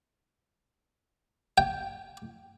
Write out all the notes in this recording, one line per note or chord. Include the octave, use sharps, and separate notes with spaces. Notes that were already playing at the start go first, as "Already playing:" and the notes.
G5